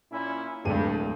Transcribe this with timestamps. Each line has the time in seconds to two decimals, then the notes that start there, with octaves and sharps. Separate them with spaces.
0.11 A#2 C#4 E4
0.65 D1 G2 G#3 D#7